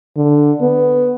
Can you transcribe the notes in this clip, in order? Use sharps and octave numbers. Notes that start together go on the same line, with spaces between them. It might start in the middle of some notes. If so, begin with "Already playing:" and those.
D3
B3